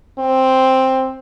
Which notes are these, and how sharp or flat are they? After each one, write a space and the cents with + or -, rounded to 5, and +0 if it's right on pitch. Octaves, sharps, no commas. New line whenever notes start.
C4 +5